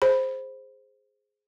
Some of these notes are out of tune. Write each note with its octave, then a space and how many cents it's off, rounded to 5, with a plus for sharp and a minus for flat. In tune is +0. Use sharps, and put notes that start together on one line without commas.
G#4 +0 C5 +0 B5 +0